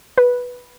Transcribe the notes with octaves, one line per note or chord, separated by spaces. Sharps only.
B4